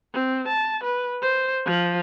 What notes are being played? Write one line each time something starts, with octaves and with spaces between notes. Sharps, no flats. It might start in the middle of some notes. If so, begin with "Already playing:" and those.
C4
A5
B4
C5
F3